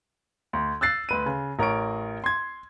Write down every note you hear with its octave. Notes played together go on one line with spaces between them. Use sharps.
D2
E6 F#6 A6 C7
D2 B4 D#7
C#3
A1 A#4 C#5 C#6 D7
C6 G#6